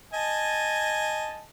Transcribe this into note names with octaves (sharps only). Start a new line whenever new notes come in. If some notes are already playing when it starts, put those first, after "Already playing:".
D#5 G#5 A5